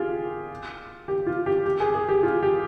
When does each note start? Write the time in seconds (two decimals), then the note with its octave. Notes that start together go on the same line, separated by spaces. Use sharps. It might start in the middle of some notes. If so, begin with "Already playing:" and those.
Already playing: F4 G4 G#4
1.08 G4
1.27 F4
1.46 G4
1.66 G4
1.80 G#4
1.94 G#4
2.09 G4
2.23 F4
2.43 G4